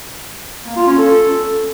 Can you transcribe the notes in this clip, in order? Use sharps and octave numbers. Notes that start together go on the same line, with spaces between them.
A#3
F4
C#4
A4